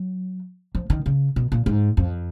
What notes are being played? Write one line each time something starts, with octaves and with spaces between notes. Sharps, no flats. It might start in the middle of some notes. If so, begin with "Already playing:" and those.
Already playing: F#3
F3
D#3
C#3
B2
A#2
G#2
F2